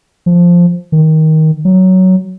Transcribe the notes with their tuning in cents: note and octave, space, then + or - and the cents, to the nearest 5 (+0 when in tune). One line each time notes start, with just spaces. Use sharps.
F3 +0
D#3 +15
F#3 +10